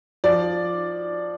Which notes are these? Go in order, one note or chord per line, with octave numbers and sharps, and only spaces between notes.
F3 D5